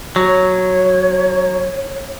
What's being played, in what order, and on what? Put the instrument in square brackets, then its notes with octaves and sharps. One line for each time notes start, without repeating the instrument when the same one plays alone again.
[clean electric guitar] F#3 [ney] C#5